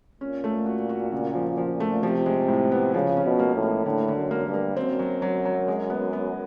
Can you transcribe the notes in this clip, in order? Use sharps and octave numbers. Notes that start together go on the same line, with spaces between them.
A#2 C#4
A3
F#4
F#4
C#3
F3
F3
A3
C3 F3
G#3
A2
B3
C#3 F3
C#4
B2
A#3
A2
A#3
A2 D3
D3
F#2
A#3
G2
A#3
F#2 C4
F#3
F#3
F#3
G#3
B3
B3